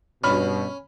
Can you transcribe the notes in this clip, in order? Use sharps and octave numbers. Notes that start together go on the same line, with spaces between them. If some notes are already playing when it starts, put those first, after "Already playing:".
G2 B2 C#4 B5 F6